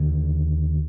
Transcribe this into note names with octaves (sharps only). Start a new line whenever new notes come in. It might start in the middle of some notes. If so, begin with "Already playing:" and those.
Already playing: D#2 D3